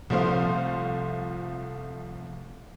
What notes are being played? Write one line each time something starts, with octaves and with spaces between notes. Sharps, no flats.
C2 F3 A3 C5 F5